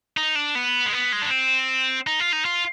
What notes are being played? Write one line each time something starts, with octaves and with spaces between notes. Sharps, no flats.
D#4
D4
B3
G#3
B3
G#3
D4
C4
D#4
F4
D#4
F4